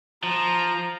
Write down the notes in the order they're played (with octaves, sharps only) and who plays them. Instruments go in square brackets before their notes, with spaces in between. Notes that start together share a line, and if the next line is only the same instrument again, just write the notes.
[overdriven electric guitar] F3 [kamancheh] A#5